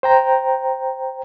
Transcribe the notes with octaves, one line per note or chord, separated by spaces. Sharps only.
C5 G5 A#5